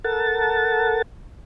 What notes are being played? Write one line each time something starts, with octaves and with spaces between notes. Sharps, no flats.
A4 A#4 F#5 A5 A6